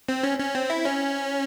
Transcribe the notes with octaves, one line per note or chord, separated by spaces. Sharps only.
C4
C#4
C#4
C4
E4
C#4